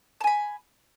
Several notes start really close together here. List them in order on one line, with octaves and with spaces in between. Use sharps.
A5 G#5 B5